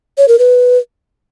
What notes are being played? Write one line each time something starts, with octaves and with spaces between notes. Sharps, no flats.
C#5
A#4
B4